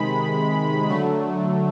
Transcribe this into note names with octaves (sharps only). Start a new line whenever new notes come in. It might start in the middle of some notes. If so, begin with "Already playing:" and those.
Already playing: C3 D#3 G#3 B5
D3 F#3 A3